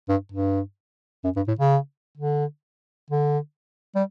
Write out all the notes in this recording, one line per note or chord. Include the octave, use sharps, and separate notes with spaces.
G2
G2
F#2
G2
A2
C#3
D3
D3
G3